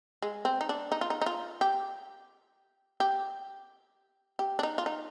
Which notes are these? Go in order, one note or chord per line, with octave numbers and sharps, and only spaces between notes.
G#3
C4
D#4
D4
D#4
F4
D#4
D#4
F4
G4
G4
G4
D4
D#4
F4
D#4